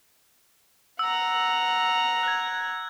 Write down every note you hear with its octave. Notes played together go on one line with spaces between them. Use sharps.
F#5 A#5 E6
F#6 G#6